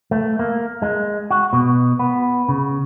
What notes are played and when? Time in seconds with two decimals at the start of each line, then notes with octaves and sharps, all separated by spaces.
0.11 A3
0.39 A#3
0.82 G#3
1.30 F#4
1.53 B2
1.99 B3
2.49 C#3